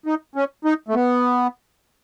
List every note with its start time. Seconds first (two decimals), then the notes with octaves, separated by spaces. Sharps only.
0.06 D#4
0.35 C#4
0.65 D#4
0.88 A3
0.94 B3